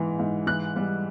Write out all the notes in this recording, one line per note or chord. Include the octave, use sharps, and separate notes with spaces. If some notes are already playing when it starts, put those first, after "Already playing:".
Already playing: G#2 E3
G#2
E3 F#6
G3